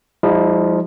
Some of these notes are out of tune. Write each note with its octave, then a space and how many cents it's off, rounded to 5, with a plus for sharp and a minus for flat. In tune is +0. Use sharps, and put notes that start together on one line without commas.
F3 +0 G#3 -45 E4 -45